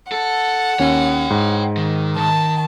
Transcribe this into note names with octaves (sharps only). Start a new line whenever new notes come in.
A4 F#5
D#2 C#4 C#5 G5
G#2
D#3
D#3 A5